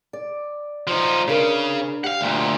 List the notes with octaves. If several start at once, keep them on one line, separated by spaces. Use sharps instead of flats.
D5
F3 D#4
C#3 D4 A#4 B4
G4 F5 F#5
D2 A#2